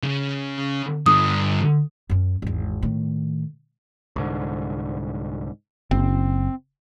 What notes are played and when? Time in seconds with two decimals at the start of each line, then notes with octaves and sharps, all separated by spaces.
0.03 C#3
1.06 G2 D3 D#6
2.10 F#2 C#4
2.42 G#1 E2
2.83 A2 D#3
4.16 C2 G#2 D3
5.91 F#1 C4